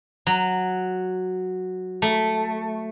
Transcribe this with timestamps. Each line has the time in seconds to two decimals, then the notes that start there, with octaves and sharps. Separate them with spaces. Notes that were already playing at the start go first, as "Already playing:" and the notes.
0.27 F#3
2.02 A3